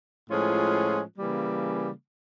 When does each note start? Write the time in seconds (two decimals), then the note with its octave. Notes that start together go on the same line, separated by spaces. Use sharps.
0.29 A2 F3 G#3 C#4 F4
1.18 C#3 E3 G3 A#3